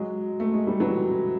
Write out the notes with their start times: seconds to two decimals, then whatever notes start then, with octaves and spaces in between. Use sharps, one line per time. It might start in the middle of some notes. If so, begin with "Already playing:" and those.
Already playing: F#3 G#3
0.40 A3
0.54 G#3
0.67 G3
0.80 E3 F#3